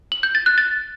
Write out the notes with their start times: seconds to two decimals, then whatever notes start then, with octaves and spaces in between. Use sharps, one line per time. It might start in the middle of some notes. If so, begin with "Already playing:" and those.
0.12 F#7
0.23 G6
0.35 A6
0.46 F#6
0.58 A6